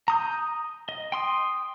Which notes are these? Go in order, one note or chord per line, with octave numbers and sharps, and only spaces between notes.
A#5 D#6 G6
D#5
G5 C6 D#6